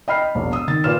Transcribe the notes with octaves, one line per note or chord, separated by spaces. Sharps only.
D#5 G5 B5 F6 C7
B5
E1 A#1
D#6 E6
D#3 A6
A#2 F4 B4 D5 F6 E7